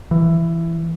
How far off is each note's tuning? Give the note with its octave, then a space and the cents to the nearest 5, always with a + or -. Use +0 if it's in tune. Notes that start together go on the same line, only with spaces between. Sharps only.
E3 +15